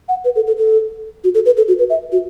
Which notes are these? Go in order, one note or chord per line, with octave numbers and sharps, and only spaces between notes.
F#5
B4
A4
A4
A4
F#4
A4
B4
A4
F#4
B4
E5
F#4